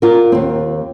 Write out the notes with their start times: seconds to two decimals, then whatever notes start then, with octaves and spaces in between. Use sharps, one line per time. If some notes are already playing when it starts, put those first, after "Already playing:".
0.02 F4 A#4
0.32 D#2 C4